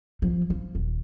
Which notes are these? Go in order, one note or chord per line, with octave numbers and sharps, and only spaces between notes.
F3
F3
D#1